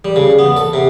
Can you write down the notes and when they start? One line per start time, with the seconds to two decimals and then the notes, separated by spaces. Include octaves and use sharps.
0.05 G3
0.16 C#3
0.39 B3
0.56 A4
0.73 C3